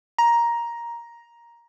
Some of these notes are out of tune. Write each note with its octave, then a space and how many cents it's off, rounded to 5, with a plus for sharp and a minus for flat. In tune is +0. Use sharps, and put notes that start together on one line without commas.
A#5 +10